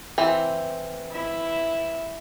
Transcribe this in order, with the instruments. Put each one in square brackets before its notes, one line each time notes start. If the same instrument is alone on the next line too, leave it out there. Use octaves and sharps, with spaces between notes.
[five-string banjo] E3 C4
[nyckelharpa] E4 E5